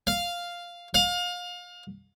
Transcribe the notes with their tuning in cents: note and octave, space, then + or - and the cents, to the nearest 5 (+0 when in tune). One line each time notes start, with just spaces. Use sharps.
F5 +0
F5 +30